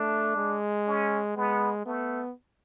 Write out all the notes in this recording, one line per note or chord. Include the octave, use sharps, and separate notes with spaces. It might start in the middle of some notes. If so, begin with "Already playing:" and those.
Already playing: A3 D4
G#3
C#4
G#3 B3
A3 B3